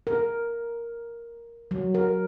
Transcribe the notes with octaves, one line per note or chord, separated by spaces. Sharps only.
A#4
F#3
A#4